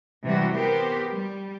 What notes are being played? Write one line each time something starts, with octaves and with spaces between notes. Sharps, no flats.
C3 E3 G3 G#3 F#4
B3 G4 A#4 C5
G3